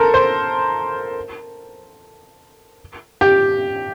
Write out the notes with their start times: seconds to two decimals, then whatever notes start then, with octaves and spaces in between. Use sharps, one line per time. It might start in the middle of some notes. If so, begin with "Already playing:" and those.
Already playing: A4 A#4 C5
0.14 C5
3.21 G4